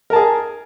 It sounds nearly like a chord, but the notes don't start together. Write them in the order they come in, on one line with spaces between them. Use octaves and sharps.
A#4 A5 G#4